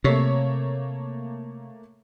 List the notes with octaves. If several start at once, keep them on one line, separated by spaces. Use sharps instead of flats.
C3 A3 A#3 C#5